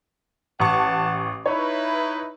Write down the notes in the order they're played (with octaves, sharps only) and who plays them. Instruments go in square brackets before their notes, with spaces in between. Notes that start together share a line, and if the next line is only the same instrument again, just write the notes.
[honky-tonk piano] A1 C#6 [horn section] F#5 A5
[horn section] D#4 E4 B4 [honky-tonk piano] C#5